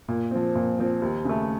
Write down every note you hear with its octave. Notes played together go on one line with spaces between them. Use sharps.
A#2
F3 C4
A#2
F3 C4
D#2
C#3 A3